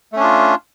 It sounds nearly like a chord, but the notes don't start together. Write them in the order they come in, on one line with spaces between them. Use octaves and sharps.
A3 C#4 D4 F4